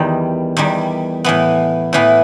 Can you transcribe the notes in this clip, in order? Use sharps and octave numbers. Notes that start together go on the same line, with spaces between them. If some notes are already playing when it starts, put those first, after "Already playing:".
Already playing: E2 D#3 G3
E2 D#3 G3
A2 E3 B3
A2 E3 B3